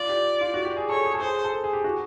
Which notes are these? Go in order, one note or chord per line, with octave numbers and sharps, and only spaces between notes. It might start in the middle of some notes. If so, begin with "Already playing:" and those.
Already playing: F4 D5
G4
F4
F#4
G4
G#4
A4 C#5
G#4
A4
G#4 C5
A4
G#4
G#4
G4
F#4